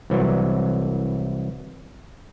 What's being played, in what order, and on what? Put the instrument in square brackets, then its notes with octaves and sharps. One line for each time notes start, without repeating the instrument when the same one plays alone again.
[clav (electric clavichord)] C2 E3 F#3